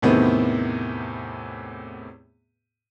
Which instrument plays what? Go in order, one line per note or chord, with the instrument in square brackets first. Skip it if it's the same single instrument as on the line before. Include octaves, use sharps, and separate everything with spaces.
[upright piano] E2 A2 C3 D#3 B3 C4